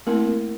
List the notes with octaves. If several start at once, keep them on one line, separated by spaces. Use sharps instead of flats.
A3 A#3 C4 E4 A#4